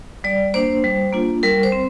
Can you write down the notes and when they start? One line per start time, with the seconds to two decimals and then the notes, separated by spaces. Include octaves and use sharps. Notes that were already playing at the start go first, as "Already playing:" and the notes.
0.24 G3 D5
0.54 A#3 D4 C5
0.84 G3
1.13 A#3 D4 F4
1.43 G3 A#4
1.63 C5
1.72 C4